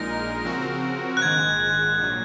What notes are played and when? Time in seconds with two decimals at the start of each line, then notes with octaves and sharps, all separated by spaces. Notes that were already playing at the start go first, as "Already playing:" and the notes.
Already playing: A#1 A#2 G#3 D#4 A#4 A#6
0.45 C#3 F3 C4 F#4 A#4
1.17 F#6
1.22 A#1 G#2 D#3 G#3 G#6
1.99 A#1 A#2 F#3